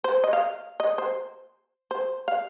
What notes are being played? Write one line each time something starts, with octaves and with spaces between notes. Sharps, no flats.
C5
D#5
F5
D#5
C5
C5
F5